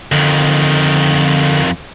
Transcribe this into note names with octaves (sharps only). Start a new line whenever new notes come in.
F2 D3 D#3